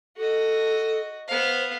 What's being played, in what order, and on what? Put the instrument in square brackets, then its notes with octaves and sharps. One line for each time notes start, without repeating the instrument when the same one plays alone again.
[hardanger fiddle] F#4 D#5 [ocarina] A4
[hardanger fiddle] B3 F5 [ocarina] C5